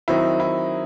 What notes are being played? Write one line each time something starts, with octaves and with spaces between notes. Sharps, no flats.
D#3 F#3 C4 D#4 E4
E4